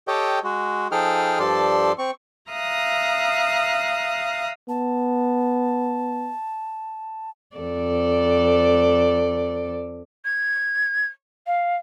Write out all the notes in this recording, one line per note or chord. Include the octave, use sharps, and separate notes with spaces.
G4 A4 C#5 D#5 G5
G#3 F#4
F3 D#4 G#4 A4 G5 F6
G2 F3 A4 D5 C6
C4 C#6
E5 F5 A#5 D#6 F#6
B3 A5
F2 A4 D5
G#6
F5